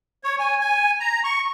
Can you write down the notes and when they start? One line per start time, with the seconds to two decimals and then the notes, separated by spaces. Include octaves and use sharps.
0.24 C#5
0.39 G#5
0.60 G#5
1.00 A#5
1.24 C#6